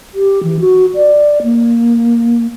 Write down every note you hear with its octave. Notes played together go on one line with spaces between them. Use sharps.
G4
E3
F#4
D5
A#3